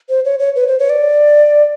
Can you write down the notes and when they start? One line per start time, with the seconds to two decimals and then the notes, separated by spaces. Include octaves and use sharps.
0.09 C5
0.25 C#5
0.39 C#5
0.56 B4
0.68 C5
0.79 C#5
0.90 D5